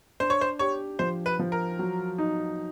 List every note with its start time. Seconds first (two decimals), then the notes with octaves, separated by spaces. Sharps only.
0.20 D4 C5
0.30 C#5
0.41 C5
0.59 G4 C#5
0.99 F3 C5
1.26 B4
1.39 F3
1.52 A#4
1.79 F#3
2.18 D#4